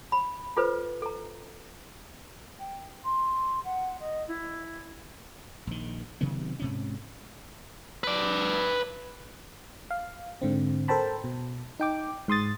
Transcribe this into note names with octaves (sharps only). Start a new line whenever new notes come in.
B5
F4 A4 B4 C5
A4 A#5
G5
C6
F#5
D#5
E4
A#1 D#3
C3 D#3 F#3 B3
G#2 C3 C#4
B4 D5
F5
G#2 D3 C4
A4 A#4 C5 G5 A5 B5
B2
D#4 G5 D6
G#2 C6 D#6 A6